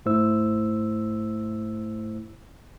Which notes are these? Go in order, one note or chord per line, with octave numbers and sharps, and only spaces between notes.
G#2 A3 E4 C5 E6